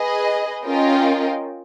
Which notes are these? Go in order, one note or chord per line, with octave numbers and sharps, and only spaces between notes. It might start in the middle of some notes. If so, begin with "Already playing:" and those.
Already playing: G#4 B4 D#5
C#4 F4 A#4 D#5 G5